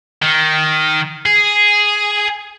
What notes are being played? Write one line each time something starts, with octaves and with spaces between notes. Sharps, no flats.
D#3
G#4